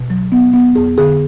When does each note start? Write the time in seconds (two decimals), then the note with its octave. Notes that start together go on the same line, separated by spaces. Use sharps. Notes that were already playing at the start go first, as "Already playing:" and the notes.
Already playing: B2
0.10 F#3
0.32 B3
0.53 B3
0.75 F2 G#4
0.98 D3 G#4